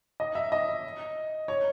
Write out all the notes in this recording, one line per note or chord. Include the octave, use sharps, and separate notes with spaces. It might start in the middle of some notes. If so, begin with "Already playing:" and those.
D#5
E5
D#5
C#5